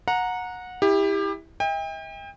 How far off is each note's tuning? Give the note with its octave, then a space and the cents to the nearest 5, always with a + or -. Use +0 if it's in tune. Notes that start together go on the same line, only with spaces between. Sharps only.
F#5 -20 A#5 +0
E4 -15 G4 +25
E5 -45 G5 +35